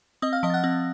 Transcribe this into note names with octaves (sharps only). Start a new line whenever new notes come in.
C4 D#5 D#6
F5 F6
F3 D#5 D#6
A6
F#5 F#6
C4